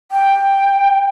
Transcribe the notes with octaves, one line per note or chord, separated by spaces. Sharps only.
G5